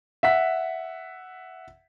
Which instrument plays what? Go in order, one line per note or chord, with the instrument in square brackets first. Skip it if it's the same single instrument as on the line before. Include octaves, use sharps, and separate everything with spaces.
[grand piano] E5 F#5 B6